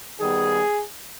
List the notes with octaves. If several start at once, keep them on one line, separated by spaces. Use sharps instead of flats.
D#3 G3 B3 G#4